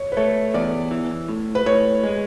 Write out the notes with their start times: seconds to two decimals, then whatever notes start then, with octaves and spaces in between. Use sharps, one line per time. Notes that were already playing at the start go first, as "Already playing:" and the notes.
Already playing: C#5
0.12 B4
0.17 A3 C#5
0.54 E2 D5
0.91 E3
1.29 A2
1.55 B4
1.66 A2 C#5
2.04 G#3